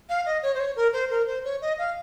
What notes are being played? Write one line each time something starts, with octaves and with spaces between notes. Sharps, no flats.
F5
D#5
C#5
C5
C#5
A#4
C5
A#4
C5
C#5
D#5
F5